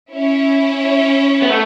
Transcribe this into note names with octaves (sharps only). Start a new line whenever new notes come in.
C#4 E4
B3
A3